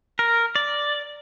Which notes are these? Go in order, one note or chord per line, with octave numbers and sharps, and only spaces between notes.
A#4
D5